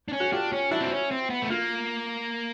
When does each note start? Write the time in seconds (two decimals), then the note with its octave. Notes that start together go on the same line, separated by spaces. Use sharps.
0.08 D4
0.13 C#4
0.20 F#4
0.32 D4 F4 G4
0.52 C#4
0.71 D4 E4 F#4
0.81 C4
0.91 C#4
1.11 C4
1.30 B3
1.42 A3
1.50 A#3 F4